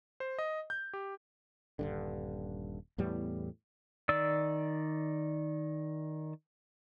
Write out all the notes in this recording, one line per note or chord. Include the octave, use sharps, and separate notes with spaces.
C5
D#5
G6
G4
D#1 G2 D3
E2 A2 G3 B3
D#3 D5 E6